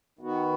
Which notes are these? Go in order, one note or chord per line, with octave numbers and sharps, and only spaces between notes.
D#3 B3 F#4